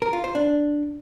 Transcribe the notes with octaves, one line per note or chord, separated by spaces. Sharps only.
A#4
F4
C5
D4